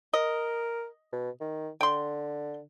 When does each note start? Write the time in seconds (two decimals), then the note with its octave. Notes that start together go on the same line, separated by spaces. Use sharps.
0.14 A#4 D#5
1.12 B2
1.41 D#3
1.81 D3 G5 C6